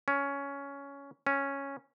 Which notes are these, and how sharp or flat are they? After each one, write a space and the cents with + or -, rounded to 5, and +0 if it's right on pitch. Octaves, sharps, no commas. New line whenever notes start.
C#4 +10
C#4 -5